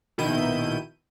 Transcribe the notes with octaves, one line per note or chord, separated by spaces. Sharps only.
A#1 B2 D#3 E4 G6 D#7